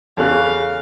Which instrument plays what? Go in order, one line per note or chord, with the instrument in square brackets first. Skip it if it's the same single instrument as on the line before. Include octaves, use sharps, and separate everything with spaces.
[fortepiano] E2 C#3 [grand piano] A4 C#5 F#6 [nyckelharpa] F5